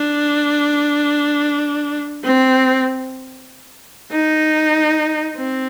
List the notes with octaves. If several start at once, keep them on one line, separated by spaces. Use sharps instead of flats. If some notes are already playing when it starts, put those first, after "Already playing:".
Already playing: D4
C4
D#4
C4